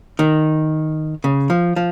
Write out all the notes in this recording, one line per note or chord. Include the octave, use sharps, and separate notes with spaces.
D#3
C#3
F3
F3